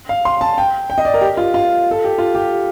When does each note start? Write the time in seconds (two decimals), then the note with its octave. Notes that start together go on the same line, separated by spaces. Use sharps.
0.09 F5
0.25 C6
0.41 A5
0.58 G5
0.90 G5
0.98 D#5
1.05 D5
1.14 A#4
1.21 G4
1.37 F4
1.54 F4
1.91 A4
2.04 G4
2.18 F4
2.35 G4